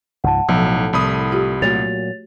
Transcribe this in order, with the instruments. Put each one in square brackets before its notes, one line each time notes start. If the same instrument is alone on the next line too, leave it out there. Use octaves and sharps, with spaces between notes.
[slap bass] C#2 G#2 F3 [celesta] F#5 A5
[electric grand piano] B1 [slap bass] A2 [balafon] F3
[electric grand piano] C2 B5 D#6
[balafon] F4 G4
[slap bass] A#2 F#3 [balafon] A3 F#4 [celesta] C#5 A6 F7